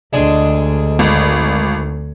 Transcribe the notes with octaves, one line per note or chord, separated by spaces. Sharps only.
D2 G#3 D4 G#4
G#1